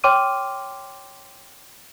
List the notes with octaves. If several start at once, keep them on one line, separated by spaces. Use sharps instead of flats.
C#5 G5 C6 D6 F6 D#7